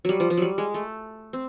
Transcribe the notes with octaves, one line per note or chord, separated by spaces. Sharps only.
F#3 G3
F3
F3
F#3 G3
G#3
A3
C4